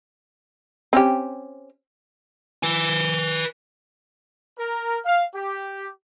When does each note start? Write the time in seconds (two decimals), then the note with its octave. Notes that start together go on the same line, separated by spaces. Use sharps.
0.93 C4 C#4 G4
2.63 B4 G#5
4.58 A#4
5.04 F5
5.35 G4